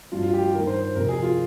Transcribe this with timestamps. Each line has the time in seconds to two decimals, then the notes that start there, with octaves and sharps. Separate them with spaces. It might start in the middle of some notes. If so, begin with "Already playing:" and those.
0.12 G2 F3 F4
0.23 F4
0.34 G4
0.44 G4
0.53 G2 D#3 A#4
0.67 C5
0.81 C5
0.95 F2 C3 F3 A#4
1.09 G#4
1.23 F4